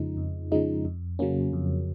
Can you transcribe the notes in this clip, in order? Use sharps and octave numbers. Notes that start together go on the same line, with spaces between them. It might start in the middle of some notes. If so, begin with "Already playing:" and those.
Already playing: F2 C#3 F3 G#3 D#4
F2
C#3 F3 G#3 D#4
F2
C#3 F#3 A#3 C#4
F2